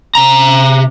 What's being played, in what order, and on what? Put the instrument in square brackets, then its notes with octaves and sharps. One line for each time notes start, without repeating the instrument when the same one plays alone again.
[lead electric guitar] C3 A#5